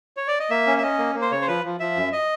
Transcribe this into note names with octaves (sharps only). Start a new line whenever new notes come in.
C#5
D5
D#5
A#3 E5
C#4
E5
C#4 D#5
A#3
A#3
C5
C#3 C#5
C5
F3 B4
F3
F3 E5
F#2
D#5